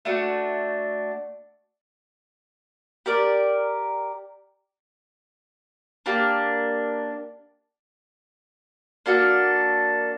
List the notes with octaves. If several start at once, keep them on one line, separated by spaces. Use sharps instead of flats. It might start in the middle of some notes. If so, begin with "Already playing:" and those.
A3 D4 F#4
G4 A#4 D5
A#3 D4 G4
A#3 D4 F#4 A4